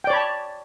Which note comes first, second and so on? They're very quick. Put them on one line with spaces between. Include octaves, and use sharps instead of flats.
G5 D5 C#5 B5 A5